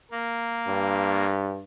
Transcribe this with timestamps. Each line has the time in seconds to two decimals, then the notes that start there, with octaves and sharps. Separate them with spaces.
0.11 A#3
0.67 G2